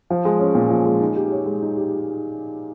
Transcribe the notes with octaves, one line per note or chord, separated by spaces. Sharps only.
F3
G#3
C#4
A#2
F3
G#3
D#4
G4
C#5
G#3
D#4
G4